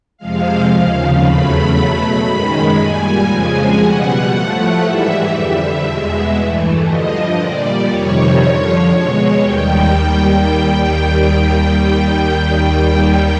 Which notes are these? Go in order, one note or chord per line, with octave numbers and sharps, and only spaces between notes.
F2 C3 F3 G#3 F5
D#2 C#3 F3
E2 C#3 F#3 A3 B5
B2 F#3 A3 B5
F#2 D#3 G#3
A#2 G3 G#5
F2 C#3 F3 G#3
B2 G3 F#5
A2 F3 A3
G#2 E3 G3 E5
F2 D3 G3 E5
E2 B2 G#3
G2 E3 A3
G2 D3 F3 D#5
A#2 G3 D5
F2 C3 D#3 G3 C#5
F2 D3 F3
B2 G#3 C#5
D#2 D#3 G3 G5